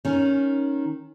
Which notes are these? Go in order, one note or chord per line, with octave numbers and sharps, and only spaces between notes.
D#3 C#4